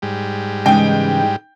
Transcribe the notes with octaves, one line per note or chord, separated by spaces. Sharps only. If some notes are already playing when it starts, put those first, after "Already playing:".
G#2 G3
C#3 E3 G#3 D#4 G5